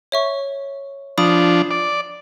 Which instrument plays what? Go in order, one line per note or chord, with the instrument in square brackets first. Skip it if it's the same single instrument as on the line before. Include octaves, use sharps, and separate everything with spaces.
[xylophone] C#5 E5 C#6
[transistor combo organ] F3 D4 [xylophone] B5 D#6
[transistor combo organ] D5